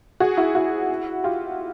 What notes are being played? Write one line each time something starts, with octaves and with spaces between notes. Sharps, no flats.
F#4 G#4
E4 F#4
E4 F#4
F4 G4